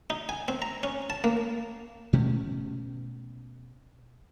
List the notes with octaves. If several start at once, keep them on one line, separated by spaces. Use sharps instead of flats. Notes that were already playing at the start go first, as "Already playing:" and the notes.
D#4
G#5
C4
A#5
C#4
A5
A#3
B2 A3 C#4